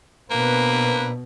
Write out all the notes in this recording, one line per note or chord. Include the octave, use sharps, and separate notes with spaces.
B2 A#3 C4 D4 B4